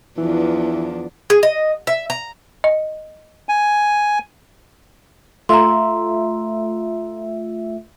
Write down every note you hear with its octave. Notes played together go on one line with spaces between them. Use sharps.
E2 E3 F3 D4
G#4
D#5
E5
A#5
D#5
G#5
A3 F4 E5 A#5 C6